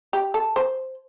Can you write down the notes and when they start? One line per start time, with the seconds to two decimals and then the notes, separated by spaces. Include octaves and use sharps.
0.13 G4
0.34 A4
0.56 C5